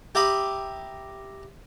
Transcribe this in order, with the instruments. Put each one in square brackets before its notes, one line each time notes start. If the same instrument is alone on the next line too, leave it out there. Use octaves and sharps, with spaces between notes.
[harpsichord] G4 E5 A#5 B5 D#6